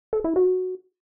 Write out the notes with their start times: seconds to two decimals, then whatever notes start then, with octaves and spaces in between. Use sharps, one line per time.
0.13 A4
0.24 E4
0.36 F#4